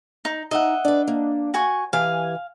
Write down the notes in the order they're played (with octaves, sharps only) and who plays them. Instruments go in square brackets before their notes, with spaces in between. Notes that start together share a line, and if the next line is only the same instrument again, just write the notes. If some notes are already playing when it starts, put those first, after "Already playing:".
[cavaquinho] D#4
[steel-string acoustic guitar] D#4 [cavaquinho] D#5 E5 F#5
[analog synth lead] D4 [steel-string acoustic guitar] B4 D5
[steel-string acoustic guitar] A#3
[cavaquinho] F#4 G#5 C#6
[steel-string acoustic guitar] E3 G4 [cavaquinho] F5 [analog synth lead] G#5